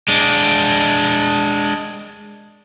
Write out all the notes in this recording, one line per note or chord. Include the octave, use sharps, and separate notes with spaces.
G#3 D4